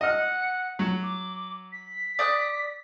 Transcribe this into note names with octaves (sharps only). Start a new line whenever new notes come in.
D#5 F#5 F6
F#3
D6
B6
D5 D#6 F#6